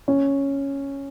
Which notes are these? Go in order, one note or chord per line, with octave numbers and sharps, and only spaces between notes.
C#4